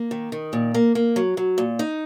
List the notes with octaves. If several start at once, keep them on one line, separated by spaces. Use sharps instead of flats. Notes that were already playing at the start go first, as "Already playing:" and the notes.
Already playing: A#3
D#3
D#3
A#2
A#3
A#3
F#3
F#3
A#2
D#4